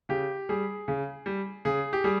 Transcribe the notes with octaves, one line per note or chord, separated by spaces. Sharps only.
C#3 G4
G3 G#4
C#3
G3
C#3 G#4
G4
G3 G#4